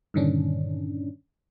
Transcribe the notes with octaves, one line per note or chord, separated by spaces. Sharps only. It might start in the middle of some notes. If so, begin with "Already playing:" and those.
G2 A#2 D3 D#3 C#4 D4